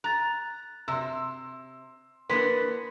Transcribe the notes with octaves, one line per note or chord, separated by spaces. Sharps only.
A#5 F#6 A6
C3 C6 E6
E3 A#3 B3 D4 B4 C6 B6